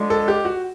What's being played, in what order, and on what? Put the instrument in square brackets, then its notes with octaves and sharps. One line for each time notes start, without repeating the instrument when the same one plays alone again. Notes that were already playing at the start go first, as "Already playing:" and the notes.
Already playing: [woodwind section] D3 F3 G#3
[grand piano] A4
G4
F#4